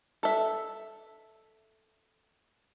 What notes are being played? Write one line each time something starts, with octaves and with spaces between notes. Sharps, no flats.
A4 E5